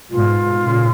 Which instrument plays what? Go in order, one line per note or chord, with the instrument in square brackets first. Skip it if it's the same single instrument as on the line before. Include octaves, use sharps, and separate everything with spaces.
[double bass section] G#2 B2 [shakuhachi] F4
[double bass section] A#2 C#3